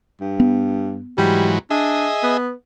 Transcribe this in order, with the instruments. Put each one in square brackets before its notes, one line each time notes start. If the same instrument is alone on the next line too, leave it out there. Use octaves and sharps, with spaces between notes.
[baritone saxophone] G2
[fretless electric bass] B3
[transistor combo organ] G#2 E3 F#3 [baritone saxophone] G3
[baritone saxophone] D4 [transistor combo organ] G#4 D#5 E5
[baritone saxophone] B3